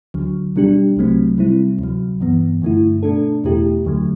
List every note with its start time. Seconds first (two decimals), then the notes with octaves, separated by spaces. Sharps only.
0.14 D2 D3 F#3
0.56 B2 G3 D4 G4
0.97 C2 C3 F#3 A3 C4
1.38 C3 G3 C4 E4
1.79 D2 C3 F#3
2.21 G2 E3 B3
2.62 G2 D3 A3 E4
3.03 B2 A3 D4 A4
3.44 E2 B2 A3 E4 G4
3.85 D2 D3 F#3 A3